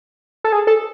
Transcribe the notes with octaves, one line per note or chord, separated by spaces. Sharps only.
A4
G#4
A4